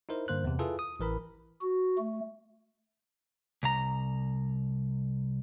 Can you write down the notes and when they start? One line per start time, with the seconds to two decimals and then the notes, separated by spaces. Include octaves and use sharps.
0.09 D#4 E4 A#4 C5
0.28 G2 D3 A#3 C5 F#6
0.44 E2 C3
0.59 E4 F4 G#4 A4 B4
0.79 D#6
1.00 A1 E3 A#4 B5
1.62 F#4
1.99 A3
3.63 C2 A#5